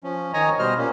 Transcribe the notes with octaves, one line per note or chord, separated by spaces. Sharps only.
F3 C#4
D#3 C#5 D#5 G#5 A#5
B2 G3 C5 D#5 F6
A#2 A#3 C#4